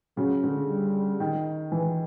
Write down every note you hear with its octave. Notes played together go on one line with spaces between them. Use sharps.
C#3 F#3
D3
G3
D#3
E3